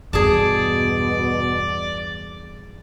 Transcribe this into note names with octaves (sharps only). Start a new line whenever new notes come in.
E2 G2 B2 G#4 D5 A5